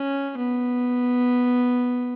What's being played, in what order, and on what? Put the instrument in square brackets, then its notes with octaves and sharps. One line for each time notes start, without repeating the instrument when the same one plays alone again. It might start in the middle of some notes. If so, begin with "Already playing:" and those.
Already playing: [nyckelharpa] C#4
B3